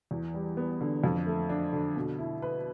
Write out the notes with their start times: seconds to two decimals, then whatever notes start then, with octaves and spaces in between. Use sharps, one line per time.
0.11 E2
0.34 G3
0.57 B3
0.81 D3
1.04 F2
1.27 A3
1.49 D4
1.73 D3
1.96 B2
2.19 E4
2.42 B4